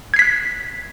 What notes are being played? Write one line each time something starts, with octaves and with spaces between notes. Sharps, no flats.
F#6 G#6 B6 C7